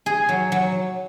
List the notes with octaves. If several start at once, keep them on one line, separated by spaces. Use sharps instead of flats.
G#4
F#3
F#3